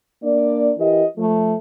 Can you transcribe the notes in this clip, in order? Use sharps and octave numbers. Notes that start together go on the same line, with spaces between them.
A#3 D4 D5
E3 G4 A#4 D#5
F3 A3